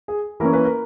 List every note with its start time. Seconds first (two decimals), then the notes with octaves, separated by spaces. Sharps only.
0.08 G#4
0.40 E3 A#3 C#4 A#4
0.53 B4
0.65 A#4